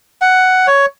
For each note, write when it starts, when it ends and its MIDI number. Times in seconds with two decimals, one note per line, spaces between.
0.22 0.67 78
0.67 0.86 73